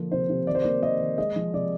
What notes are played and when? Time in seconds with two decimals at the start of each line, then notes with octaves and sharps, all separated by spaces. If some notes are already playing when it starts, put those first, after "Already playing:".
Already playing: D3 F3 A#3
0.12 C3 C5
0.29 C3
0.47 D#3 D5
0.55 C5
0.62 D5
0.65 A#3
0.83 A#3 D#5
1.00 D#3
1.18 G#3 D#5
1.36 F3
1.54 C3 D5